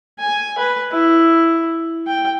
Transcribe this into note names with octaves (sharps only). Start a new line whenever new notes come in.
G#5
B4
E4
G5